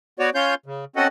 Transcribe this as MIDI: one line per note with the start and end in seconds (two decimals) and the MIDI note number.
0.19 0.30 59
0.19 0.30 66
0.19 0.30 73
0.19 0.30 74
0.35 0.55 61
0.35 0.55 65
0.35 0.55 73
0.35 0.55 84
0.35 0.55 91
0.66 0.85 49
0.96 1.07 60
0.96 1.07 61
0.96 1.07 66
0.96 1.07 69
0.96 1.07 75
0.96 1.07 78